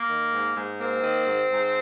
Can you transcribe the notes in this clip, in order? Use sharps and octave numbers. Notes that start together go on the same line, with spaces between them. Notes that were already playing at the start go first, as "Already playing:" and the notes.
Already playing: A#3
D#3
G#2
G#2
A#3 C4
D#3
G#2
G#2